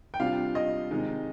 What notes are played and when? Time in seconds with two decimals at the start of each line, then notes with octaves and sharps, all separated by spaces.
0.14 G5
0.20 C3 G3 D4 F4 F5
0.55 D#5
0.91 C3 D#3 G#3 D#4